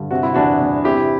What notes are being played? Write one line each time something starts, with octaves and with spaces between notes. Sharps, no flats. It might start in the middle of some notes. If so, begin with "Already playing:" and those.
Already playing: G2 D3
C3 F#4
E4
E2 D4 F#4
E2
C3 E4 G4